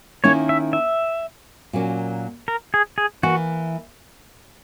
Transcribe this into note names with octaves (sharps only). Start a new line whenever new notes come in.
D#3 A#3 C#4 E4 C#5
E5
E5
A#2 F#3 A#3 C#4
A#4
G#4
G#4
E3 A#3 E4 F#4